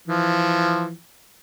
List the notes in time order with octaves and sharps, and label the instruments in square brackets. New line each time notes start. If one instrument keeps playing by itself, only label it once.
[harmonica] E3 F3